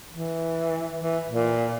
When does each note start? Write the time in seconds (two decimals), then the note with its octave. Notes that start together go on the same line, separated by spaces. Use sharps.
0.11 E3
1.00 E3
1.27 A#2